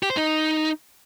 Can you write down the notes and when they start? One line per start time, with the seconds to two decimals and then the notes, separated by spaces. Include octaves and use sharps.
0.03 G4
0.10 C5
0.17 D#4